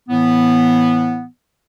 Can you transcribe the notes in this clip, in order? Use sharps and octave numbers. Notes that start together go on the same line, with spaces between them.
A2 E3 B3